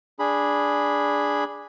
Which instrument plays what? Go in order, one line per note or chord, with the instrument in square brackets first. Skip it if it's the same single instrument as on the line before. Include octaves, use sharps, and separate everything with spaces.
[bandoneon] D4 G#4 B5